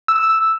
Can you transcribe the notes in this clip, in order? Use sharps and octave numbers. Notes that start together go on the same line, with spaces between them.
E6